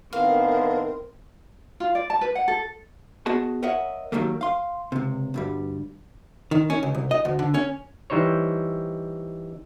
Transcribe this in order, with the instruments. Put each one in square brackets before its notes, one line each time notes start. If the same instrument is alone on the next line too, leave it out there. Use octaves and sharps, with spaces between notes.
[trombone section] A2 D#3 B3 [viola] C4 [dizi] A#4 [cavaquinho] F5
[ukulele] F4
D5
A5
B4
F#5
A4
[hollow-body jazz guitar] B3 F#4 G#4 D#5 A5
A#4 C#5 D#5 E5 F#5
D#3 F#3 G3 A3 A#3
F5 C6
C#2 C3
D2 G2 G3
D#3
C#4
C#2
C2
D#5
D2
D3
C#4
[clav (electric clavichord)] E3 G3 D#4 C5 C#5